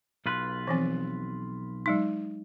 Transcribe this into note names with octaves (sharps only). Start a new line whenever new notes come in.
B1 F4 B4
E3 F3 C4
F#3 G#3 D#4